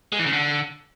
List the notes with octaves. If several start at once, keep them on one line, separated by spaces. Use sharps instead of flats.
G#3
E3
C#3
D3